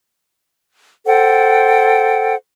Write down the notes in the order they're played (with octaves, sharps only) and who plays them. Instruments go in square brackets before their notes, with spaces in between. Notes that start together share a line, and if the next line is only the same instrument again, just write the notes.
[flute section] A4 C5 F#5 G5